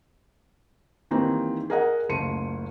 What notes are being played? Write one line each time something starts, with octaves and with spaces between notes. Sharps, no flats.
D#3 E3 G3 A#3 C4 D#4
G#4 A#4 D#5 F#5
F#1 C#2 A3 C6 C#7 D#7